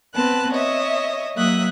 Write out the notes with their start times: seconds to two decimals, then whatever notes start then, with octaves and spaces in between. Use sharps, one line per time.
0.15 B3 C4 B4 A5 F#6
0.51 C#5 D#5 E5
1.36 F#3 A#3 E5 D#6 F#6